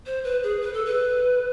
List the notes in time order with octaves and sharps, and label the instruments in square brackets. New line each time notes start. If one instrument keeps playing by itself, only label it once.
[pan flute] C5
B4
G#4
B4
A4
B4